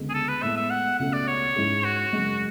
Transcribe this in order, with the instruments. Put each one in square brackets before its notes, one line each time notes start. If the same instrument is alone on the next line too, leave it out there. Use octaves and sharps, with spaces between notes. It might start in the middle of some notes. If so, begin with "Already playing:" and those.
Already playing: [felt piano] D2 C#3 G#3 B3
[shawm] G#4
A4
B4
[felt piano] A2 G#3 B3 [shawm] E5
[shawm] E5
F#5
[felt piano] C#2 B2 A3 C#4 [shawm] F#5
[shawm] D5
C#5
[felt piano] G#2 G#3 C#4 E4 G#4
[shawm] F#4
[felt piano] F#2 C#3 G#3